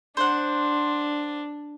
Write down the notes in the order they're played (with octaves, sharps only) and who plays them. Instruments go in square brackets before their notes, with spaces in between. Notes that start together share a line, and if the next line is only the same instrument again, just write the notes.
[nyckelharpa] D4 [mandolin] C5 F#5